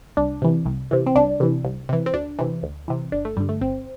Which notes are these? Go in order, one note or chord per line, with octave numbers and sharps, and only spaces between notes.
C2 D4
C3 E3
C2
C3 E3
C4
C2 D4
C3 E3
C2
C3 E3
C4
D2 D4
C3 E3
D2
C3 E3
G1 D4
A3
G2 D3 G3
A3
G1 C4